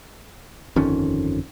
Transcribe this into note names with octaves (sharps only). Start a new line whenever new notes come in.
G1 F2 D#3 C#4